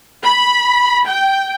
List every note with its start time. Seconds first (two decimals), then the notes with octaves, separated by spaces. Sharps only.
0.25 B5
1.08 G5